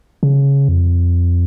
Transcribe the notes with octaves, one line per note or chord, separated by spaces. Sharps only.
C#3
F2